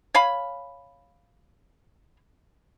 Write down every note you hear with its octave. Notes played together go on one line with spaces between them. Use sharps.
C#5 F5 G#5 B5